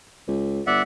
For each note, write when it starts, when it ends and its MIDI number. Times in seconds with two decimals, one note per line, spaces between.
0.28 0.61 37
0.67 0.82 31
0.67 0.82 74
0.67 0.82 76
0.67 0.82 78